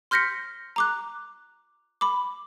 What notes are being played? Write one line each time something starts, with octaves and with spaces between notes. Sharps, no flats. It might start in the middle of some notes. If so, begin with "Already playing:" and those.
C6 F6 G6 A#6 B6 C#7
A#5 D6 F#6
B5 D6